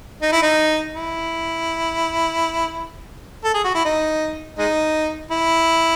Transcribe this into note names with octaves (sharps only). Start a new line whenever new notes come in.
D#4
E4
D#4
E4
A4
G#4
F#4
E4
D#4
G#3 D#4
E4